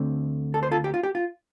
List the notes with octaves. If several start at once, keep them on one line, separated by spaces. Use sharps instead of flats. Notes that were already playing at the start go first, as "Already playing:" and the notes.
Already playing: D2 D3 A3 C4
A4
C5
F4 A4
G4
F4
G4
F4